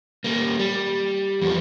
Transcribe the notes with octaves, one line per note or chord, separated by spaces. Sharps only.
G3 A#3
G3
E2 F3